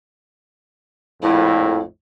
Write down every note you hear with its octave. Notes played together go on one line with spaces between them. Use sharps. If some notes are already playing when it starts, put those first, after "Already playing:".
A#1 F2 A2 E4